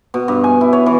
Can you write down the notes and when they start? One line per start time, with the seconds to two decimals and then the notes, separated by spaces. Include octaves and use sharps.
0.14 B2
0.28 G2
0.44 G#5
0.61 E4
0.73 C#5
0.86 E3